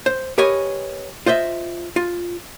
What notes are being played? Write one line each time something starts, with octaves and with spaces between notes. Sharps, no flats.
C5
G4 A#4 B4 C#5 D#5 G#5
F4 C5 D#5 E5
F4